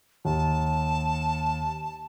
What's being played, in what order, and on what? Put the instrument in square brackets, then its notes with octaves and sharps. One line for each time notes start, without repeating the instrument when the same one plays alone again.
[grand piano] D#2 [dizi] A5